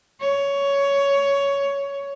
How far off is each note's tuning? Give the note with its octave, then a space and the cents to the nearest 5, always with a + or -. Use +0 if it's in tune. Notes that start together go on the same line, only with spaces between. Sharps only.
C#5 +10